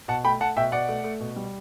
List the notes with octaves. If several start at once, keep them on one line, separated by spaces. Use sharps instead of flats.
B2 F#5 A5
A3 G5 B5
A3 F#5 A5
B2 E5 G5
B2 D5 F#5
A3
A3
B2
G3